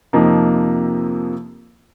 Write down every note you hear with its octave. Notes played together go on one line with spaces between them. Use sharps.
F2 C3 F3 A#3 D#4